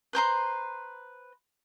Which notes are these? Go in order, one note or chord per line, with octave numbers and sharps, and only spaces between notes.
B4 C5 A#5 C6